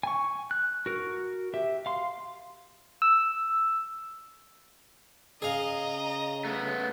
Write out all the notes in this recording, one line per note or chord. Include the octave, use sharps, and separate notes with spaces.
G#5 C#6
F#6
F#4 A#4
G4 E5
F5 C6
E6
C#3 G#4 D#5 F5 A#5
A3 B3